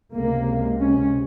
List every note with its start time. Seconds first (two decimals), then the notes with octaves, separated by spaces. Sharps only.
0.13 C#2 C3 A#3
0.79 C#4